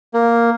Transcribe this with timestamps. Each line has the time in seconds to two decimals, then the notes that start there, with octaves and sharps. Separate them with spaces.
0.14 A#3